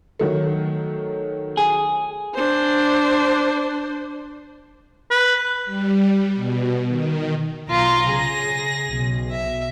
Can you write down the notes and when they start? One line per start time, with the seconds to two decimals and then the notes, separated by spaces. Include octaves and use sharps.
0.20 D#3 F#3 A3
1.57 G#4
2.34 D4 C5
5.11 B4
5.65 G3
6.34 B2
6.88 D#3
7.69 B1 F4 A#5
8.10 C#3 G#4 A#6
8.90 B1
9.31 E5